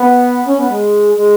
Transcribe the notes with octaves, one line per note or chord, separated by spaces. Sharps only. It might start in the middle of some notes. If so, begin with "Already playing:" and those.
Already playing: B3
C#4
B3
G#3
G#3